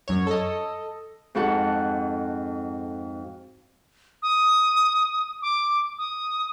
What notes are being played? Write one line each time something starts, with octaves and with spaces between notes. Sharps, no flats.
F#2 C#5
A4 D#5
F2 G#2 F#4 A4 F#5
D#6
D6
D#6